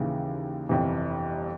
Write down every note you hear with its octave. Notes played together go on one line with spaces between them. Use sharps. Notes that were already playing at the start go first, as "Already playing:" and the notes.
Already playing: D#2 C#3 E3
G1 F2 C3 E3